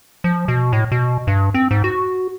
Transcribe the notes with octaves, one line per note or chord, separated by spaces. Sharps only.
F3
B2
A2
B2
G2
C4
G#2
F#4